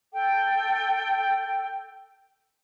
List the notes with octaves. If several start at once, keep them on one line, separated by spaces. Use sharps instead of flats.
A4 G5